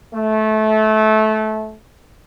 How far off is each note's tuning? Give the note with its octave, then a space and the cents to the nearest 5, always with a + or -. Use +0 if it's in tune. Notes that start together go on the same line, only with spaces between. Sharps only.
A3 -20